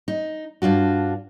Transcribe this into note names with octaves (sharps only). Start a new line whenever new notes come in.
D#4
G2 D4 F4 F#4